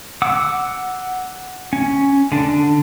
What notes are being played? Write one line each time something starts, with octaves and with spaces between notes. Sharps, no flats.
F#5 D6 E6
C#4
D3 D4